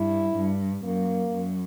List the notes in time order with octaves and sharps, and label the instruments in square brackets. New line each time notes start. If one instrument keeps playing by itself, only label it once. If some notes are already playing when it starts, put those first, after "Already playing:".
Already playing: [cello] G2 [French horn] E4
[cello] G2
[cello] F#2 [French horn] A#3
[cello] F#2